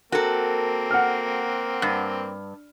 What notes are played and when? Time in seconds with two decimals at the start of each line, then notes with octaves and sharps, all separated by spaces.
0.12 A#3 C4 F#4 A4 A#4
0.91 F#5 F6
1.82 G2